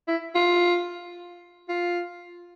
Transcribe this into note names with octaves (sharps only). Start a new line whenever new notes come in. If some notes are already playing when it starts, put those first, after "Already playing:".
E4
F4
F4